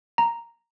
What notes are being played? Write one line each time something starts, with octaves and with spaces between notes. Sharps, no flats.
A#5